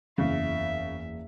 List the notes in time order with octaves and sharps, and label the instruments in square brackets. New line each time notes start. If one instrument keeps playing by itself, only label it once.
[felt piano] F#1 E2 [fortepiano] C#3 [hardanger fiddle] E5